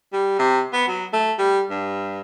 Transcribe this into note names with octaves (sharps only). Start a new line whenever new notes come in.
G3
C3
B3
F#3
A3
G3
G2